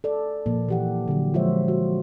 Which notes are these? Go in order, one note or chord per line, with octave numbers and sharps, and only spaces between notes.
A4 D5
A#2 F3 A#3
E3 G4 F#5
D3 F#3
F3 G#3 F4 C5 C#5 E5
F#4